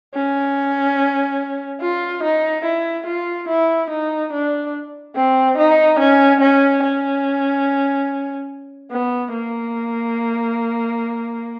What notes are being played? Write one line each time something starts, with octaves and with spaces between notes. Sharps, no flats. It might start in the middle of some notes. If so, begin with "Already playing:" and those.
C#4
F4
D#4
E4
F4
E4
D#4
D4
C4
D#4
C#4
C#4
C#4
B3
A#3